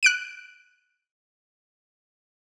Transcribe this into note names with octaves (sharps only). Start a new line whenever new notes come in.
F#6 D7 D#7